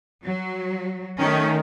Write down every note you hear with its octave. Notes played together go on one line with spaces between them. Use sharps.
F#3
D#3 A3 C#4